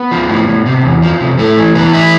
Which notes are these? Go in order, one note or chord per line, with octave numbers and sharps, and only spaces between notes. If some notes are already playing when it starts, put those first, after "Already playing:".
Already playing: B3
F3
A2
A2
C3
E2
F3
C3
A2 A3
E3
E3 B3
A2 E4